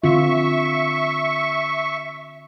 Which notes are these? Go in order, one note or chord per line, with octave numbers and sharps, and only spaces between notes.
D3 C4 F4 E5 C#6